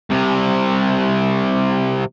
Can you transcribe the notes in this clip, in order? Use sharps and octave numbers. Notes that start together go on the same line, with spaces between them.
C2 C3